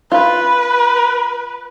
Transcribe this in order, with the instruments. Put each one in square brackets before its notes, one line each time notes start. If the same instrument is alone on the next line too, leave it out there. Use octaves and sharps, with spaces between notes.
[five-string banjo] F4 [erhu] B4